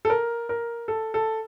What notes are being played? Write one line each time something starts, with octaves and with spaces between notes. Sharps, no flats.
A4
A#4
A#4
A4
A4